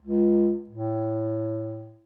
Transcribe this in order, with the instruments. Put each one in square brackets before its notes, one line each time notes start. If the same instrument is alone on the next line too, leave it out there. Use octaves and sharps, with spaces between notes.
[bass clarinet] C#2
A2